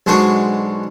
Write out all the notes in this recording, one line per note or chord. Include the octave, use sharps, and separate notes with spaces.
B1 G#3 D4 F#4 C5